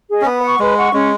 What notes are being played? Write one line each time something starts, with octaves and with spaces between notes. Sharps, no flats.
G#4 D#5
C#4
B3 B4
F#5 C#6
G#3 B4
F#5 C#6
G#3 C#4